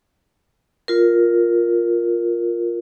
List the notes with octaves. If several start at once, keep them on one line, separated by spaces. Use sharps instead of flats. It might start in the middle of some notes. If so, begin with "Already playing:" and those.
F4 A#4